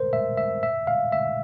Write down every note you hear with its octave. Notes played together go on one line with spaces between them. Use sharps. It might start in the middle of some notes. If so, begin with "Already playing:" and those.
Already playing: A#4 C5
E5
E5
E5
F5
E5